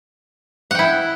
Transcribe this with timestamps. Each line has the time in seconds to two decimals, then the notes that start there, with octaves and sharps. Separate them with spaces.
0.71 F#5
0.75 G5
0.79 E4